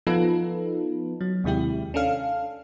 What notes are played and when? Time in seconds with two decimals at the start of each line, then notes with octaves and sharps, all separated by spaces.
0.07 F3 B3 D#4 F4 A4 B4
1.21 F#3
1.44 D#2 C3 G#3 E4 G4
1.94 C#4 D4 A4 F5